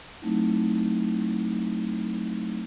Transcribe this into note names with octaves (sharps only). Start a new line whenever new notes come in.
F#3 A3 C4 D#4 E4